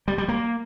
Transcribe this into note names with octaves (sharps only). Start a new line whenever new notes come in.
G3
G3
A#3